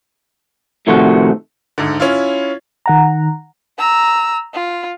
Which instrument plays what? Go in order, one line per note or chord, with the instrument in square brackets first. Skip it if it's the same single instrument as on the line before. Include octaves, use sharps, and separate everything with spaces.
[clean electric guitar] A2 C3 D#3 F3 A3 F#4
[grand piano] D2 G#2 D3
C#4 E4 F4
[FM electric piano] D#3 F#5 A#5
[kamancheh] A#5 E6
F4